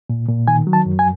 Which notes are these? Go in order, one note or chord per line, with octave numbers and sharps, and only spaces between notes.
A#2
A#2
D#3 G#5
F#3
A5
F#2
G#5